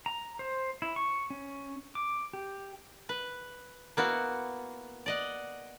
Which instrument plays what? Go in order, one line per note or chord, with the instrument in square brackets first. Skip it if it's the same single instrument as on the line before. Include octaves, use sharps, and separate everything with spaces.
[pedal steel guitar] A#5
C5
E4
C#6
C#4
D6
G4
[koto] B4
A#3 B3 E4 F#4
D5 D#5 F#5